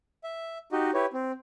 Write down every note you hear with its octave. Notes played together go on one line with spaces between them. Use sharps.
E5
D#4 F#4 G4 D#5
E4 G4 B4 C#5
C4